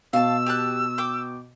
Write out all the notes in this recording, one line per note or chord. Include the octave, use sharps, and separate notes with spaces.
B2 F5 A5 E6
G4 A5 F#6
G5 D6 G6